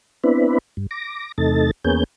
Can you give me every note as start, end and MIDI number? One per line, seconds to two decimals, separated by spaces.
0.24 0.58 59
0.24 0.58 60
0.24 0.58 62
0.24 0.58 64
0.24 0.58 71
0.77 0.87 43
0.91 1.32 86
0.91 1.32 94
1.38 1.71 40
1.38 1.71 48
1.38 1.71 57
1.38 1.71 63
1.38 1.71 69
1.38 1.71 93
1.84 2.04 40
1.84 2.04 58
1.84 2.04 59
1.84 2.04 61
1.84 2.04 68
1.84 2.04 91